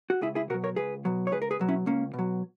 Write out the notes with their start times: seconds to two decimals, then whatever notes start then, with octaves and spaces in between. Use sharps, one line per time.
0.10 F#4
0.21 C#2 E4 G#4
0.35 E4 G#4
0.50 B2 F#4 A#4
0.54 F#3
0.64 A#4 C#5
0.76 C#2 G#4 B4
1.05 B2 F#3
1.27 C#5
1.32 C#2 G#4 B4
1.42 A#4
1.51 G#4 B4
1.59 B2 F#3
1.68 C#4 E4
1.86 C#2 A#3 C#4
2.13 B2
2.19 F#3